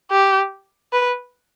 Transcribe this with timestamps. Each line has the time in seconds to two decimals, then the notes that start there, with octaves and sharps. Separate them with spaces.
0.11 G4
0.93 B4